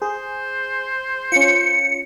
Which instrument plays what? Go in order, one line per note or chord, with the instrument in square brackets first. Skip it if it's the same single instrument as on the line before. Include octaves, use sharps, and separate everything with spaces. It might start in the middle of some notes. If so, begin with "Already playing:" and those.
[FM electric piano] G#4 [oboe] C5
[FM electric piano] C#4 F4 [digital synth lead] C#7